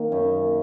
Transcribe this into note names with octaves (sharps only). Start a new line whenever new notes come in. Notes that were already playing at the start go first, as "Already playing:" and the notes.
Already playing: D#3 A#3
F#2